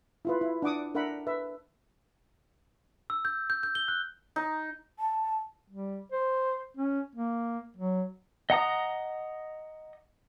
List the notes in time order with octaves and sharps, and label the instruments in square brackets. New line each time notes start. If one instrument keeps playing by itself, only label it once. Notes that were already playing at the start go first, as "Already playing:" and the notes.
[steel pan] E4 F4 B4
E4
D4 F#5 D6 D#6
D4 A#4 E5 F#5 B5
B4 E5
[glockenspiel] E6
G6
G6
G6
G7
F#6
[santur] D#4
[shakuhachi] A5
[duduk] G3
C5
C#4
A#3
F#3
[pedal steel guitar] D#5 F#5 A#5 D#6